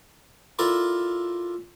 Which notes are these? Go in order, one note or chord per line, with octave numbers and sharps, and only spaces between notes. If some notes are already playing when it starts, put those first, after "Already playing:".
E4 F4 A4 A#4 D5